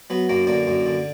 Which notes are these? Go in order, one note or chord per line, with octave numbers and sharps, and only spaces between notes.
F#3 B3
F#2 A#3
D3 A#3
F#2
D3